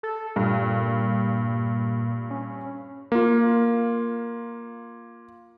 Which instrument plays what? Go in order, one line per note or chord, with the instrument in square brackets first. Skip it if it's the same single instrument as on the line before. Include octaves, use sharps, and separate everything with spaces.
[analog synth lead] A4
[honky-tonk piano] G2 [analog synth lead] A#2
[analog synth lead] C#4
[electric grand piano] A#3 F4